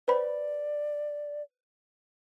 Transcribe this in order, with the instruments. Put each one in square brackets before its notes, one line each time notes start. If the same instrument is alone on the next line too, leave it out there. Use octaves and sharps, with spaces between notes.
[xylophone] B4 C5 B5 [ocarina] D5